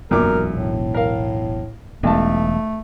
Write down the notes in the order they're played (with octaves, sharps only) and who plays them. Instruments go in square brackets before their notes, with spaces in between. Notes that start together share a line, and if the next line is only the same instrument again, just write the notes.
[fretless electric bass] E1 B1 [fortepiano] F#2 A#2 D6 [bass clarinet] A#4
[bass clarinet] A2
[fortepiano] A#4 F5
[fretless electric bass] E1 G3 [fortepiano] B1 A5 [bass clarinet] A3